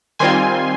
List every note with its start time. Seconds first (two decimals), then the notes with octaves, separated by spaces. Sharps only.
0.19 D#3 G3 C4 F4 G#5 C6